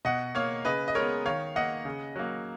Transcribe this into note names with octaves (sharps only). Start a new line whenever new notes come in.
B2 D#5 F#5
A#3 C#5 F5
C#3 B4 D#5
D#5
G#3 B3 A#4 C#5
D#3 C#5 F5
A#3 D#5 F#5
C#3
F#3 A#3